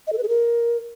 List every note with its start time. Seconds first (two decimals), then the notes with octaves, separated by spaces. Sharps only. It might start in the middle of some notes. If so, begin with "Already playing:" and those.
0.07 D#5
0.13 A4
0.18 B4
0.23 G#4
0.28 A#4